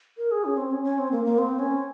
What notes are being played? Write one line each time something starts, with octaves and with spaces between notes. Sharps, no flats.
A#4
G#4
C#4
C4
C#4
C#4
C4
A#3
A#3
C4
C#4